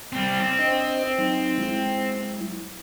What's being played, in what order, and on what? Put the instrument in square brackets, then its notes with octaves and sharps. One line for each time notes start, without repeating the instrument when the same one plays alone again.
[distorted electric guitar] G3 C4
C4
[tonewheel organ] D4 C5 D#5
F#3 D#4
F#3 G#3 E4